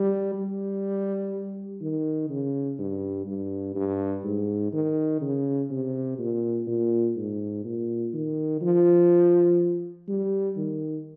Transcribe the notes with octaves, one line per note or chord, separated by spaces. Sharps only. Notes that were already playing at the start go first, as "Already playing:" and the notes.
Already playing: G3
G3
D#3
C#3
G2
G2
G2
G#2
D#3
C#3
C3
A#2
A#2
G#2
A#2
D#3
F3
G3
D#3